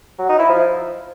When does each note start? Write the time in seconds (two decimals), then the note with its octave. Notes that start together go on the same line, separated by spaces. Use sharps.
0.18 F#3
0.29 D#4
0.39 E4
0.49 F3